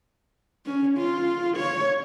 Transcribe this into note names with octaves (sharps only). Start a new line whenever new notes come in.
C#4
F4
C#5